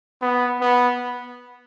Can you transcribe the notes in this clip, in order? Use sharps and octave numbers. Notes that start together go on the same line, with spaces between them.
B3
B3